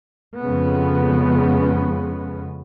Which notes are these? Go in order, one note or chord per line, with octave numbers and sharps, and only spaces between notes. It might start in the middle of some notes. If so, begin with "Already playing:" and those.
F2 C#3 G#3 B3